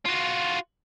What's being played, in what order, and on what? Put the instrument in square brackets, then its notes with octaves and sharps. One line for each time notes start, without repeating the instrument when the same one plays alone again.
[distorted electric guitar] F4 F#4